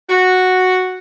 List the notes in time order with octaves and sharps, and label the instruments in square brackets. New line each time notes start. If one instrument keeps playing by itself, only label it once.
[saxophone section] F#4